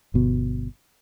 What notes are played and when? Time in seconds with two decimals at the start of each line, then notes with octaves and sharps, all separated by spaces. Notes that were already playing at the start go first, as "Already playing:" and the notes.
0.14 G1 B2